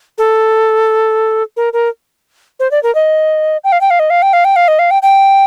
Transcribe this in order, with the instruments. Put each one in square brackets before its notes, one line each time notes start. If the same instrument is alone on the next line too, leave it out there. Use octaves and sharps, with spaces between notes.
[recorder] A4
A#4
A#4
C5
D5
A#4
D#5
G5
F5
G5
F5
D#5
F5
G5
F5
G5
F5
D#5
F5
G5
G5